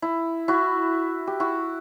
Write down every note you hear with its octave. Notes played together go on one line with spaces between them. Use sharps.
E4
E4 F#4
G4
E4 F#4